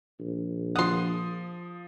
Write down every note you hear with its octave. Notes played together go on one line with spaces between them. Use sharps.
A#1
F3 F#5 C6 D#6